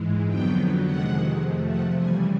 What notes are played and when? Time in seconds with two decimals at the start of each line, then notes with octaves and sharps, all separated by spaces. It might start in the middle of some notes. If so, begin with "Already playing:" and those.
Already playing: G#2 E3 G#3
0.25 F2 D3 F#3 B3 G5
0.83 F2 C3 D#3 G#3 F#5
1.40 C3 F3 A3
1.69 F#5
1.97 C#3 E3 G3 G#5